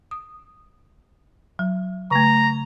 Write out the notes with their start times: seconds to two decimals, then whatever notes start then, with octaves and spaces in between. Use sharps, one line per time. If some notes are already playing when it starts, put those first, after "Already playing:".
0.11 D#6
1.59 F#3
2.11 C#3 A3 A#5